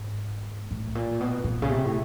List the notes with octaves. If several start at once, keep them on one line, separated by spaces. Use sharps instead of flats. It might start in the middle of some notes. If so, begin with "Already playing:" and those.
Already playing: G#2
A2
A#2
B2
A#2
C#3
C3
A2